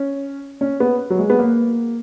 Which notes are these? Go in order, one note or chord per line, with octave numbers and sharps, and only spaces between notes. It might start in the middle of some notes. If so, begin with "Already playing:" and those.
Already playing: C#4
C#4
B3
F#3
G#3
B3
A#3